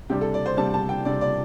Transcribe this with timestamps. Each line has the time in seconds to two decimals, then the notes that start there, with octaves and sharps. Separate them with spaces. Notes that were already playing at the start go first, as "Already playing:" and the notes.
0.10 C3 G3 D4 G4
0.21 A4
0.34 D5
0.46 C5
0.57 C3 G3 D4 A5
0.74 A5
0.89 G5
1.05 C3 G3 D4 D5
1.21 D5